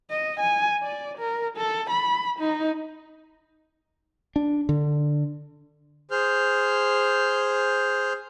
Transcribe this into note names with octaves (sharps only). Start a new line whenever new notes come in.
D#5
G#5
D5
A#4
A4
B5
D#4
D4
D3
G#4 C5 F6 G6